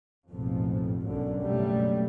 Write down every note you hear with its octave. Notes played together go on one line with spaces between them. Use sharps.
A1 F2 G#2 B2 F3
B1 F#2 B2 D3
F#1 G2 B2 F#3 G3 A3